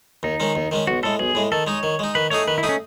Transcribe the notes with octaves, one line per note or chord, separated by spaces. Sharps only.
D#2 D#4
D#3 G#3 C#4
D#2
D#3 G#3 C#4
B1 F#4
A2 G#3 A4
B1 G#4
A2 G#3
D#3 A4
G#3 D#4 C#5
D#3
G#3 D#4
D#3 B4
A3 D#4 G#4 C#5
D#3 B4
E4
A3 D#4 G#4
C#4